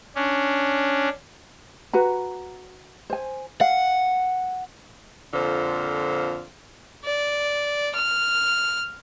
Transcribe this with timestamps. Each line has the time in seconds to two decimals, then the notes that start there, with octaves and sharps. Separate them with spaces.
0.16 C#4 D4
1.93 F#4 B4 A#5
3.10 C5 G#5
3.61 F5 F#5
5.33 F2 A#2 D3 F4 C5
7.05 D5
7.95 F6